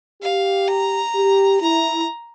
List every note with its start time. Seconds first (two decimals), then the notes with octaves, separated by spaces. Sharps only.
0.22 G4 F5
0.68 A#5
1.14 G4
1.61 E4 A#5